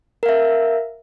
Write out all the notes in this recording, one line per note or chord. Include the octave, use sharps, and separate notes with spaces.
A#4 E5 F5